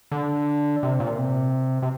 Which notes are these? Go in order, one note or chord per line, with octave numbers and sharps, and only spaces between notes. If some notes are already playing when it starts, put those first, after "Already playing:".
D3
C3
A#2
C3
C3